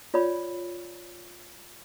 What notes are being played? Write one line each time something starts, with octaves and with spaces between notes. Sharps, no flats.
F4 C#5 D5 B5